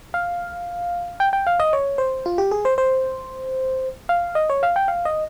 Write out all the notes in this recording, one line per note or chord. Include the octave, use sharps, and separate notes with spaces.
F5
G5
G5
F5
D#5
C#5
C5
F4
G4
G#4
C5
C5
F5
D#5
C#5
F5
G5
F5
D#5